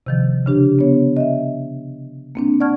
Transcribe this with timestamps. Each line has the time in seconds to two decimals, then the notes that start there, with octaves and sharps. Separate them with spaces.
0.06 C3 D#3 F3
0.46 C#3 D4 G4
0.79 B3 C#5
1.17 D#5 E5
2.35 A#3 C4 D4
2.60 D5 F#5 A5 C#6 F6 G#6